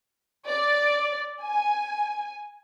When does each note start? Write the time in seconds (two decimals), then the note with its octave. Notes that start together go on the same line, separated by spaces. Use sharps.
0.48 D5
1.42 G#5